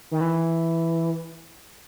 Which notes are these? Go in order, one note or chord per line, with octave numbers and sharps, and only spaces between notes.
D#3
E3